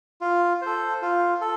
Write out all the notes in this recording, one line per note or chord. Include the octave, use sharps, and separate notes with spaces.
F4
A4 C5
F4
A4